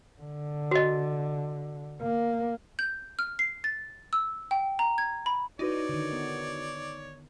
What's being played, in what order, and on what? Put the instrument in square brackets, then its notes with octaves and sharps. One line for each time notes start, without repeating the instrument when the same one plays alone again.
[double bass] D3
[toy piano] F#4 D#5
[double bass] A#3
[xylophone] G6
F6
C7
A6
E6
G5
A#5
G#6
B5
[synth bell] D#4 [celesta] E4 F#4 B4 [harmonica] C#5 D5
[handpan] D3 D#3
B3